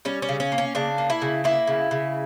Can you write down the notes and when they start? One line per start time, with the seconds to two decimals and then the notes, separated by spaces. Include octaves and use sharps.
0.05 G3 C#4
0.22 C#4
0.29 C#3
0.40 C#4
0.52 A#3
0.58 C#4
0.75 C#3 D4
0.98 A#3
1.10 E4
1.22 C#3
1.44 A#3 E4
1.67 C#3
1.91 C#3